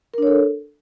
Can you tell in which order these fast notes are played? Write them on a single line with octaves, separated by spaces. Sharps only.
A#4 D4 C#5 A4